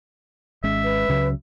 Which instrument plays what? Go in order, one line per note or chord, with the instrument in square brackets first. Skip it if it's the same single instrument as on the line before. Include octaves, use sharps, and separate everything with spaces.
[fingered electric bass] G#1 G#3 C#4 [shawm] E5
[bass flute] B4
[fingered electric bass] C#2 C#3 F#3